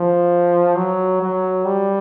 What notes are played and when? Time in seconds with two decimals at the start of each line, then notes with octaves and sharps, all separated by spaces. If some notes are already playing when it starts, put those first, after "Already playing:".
Already playing: F3
0.76 F#3
1.21 F#3
1.65 G3